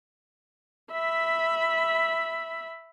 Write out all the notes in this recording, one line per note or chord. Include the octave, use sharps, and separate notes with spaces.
E5 B5